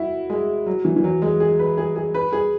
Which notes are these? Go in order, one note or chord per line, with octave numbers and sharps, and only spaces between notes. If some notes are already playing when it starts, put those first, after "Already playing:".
Already playing: E4 F#4
G#3
F#3
E3
E3
F#3
G#3
G#4
B4
G#4
G#4
B4
G#4